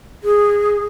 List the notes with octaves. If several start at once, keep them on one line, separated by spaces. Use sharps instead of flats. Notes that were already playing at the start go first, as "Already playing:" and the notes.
G#4